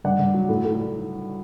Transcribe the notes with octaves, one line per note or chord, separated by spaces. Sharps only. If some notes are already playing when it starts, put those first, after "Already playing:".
G2 D5 F#5
G2
F#3
A2
A2